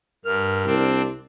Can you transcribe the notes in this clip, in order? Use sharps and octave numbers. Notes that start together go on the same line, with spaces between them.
G2 A#4 F6
C2 C4 D4